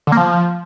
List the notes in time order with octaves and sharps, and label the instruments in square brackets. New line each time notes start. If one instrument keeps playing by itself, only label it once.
[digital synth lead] D3
A#3
F3